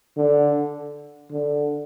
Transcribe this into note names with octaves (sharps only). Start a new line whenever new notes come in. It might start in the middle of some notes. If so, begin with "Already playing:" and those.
D3
D3